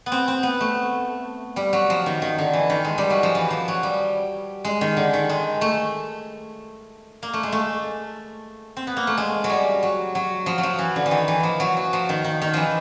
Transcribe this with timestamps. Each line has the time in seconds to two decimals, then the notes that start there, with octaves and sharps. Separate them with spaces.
0.06 B3
0.12 C4
0.28 C4
0.43 B3
0.60 A3
1.56 G3
1.73 F#3
1.90 F3
2.06 D#3
2.22 D#3
2.38 D3
2.53 E3
2.70 D#3
2.85 G#3
2.98 G3
3.10 F#3
3.23 F3
3.35 E3
3.50 F3
3.68 F#3
3.83 G3
4.65 G#3
4.81 D#3
4.97 D3
5.13 D#3
5.29 G#3
5.61 A3
7.23 A#3
7.33 A3
7.43 G#3
7.52 A3
8.77 C4
8.87 B3
8.97 A#3
9.07 A3
9.17 G#3
9.44 F#3
9.50 G3
9.83 F#3
10.15 F#3
10.46 F3
10.58 F#3
10.63 F3
10.79 E3
10.96 D3
11.06 E3
11.11 D#3
11.28 E3
11.43 F3
11.60 F#3
11.77 F#3
11.93 F3
12.09 D#3
12.24 D#3
12.42 D#3
12.53 E3 F3